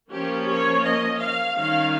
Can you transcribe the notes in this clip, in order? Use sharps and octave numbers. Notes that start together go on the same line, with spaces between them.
F3 A#3 C#4 G4
C#5
D#5
F5
D#3 G3 C#4 F5